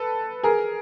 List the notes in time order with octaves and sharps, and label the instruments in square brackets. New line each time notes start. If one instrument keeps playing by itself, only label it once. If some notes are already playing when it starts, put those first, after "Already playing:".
Already playing: [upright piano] A4 B4
G#4 A#4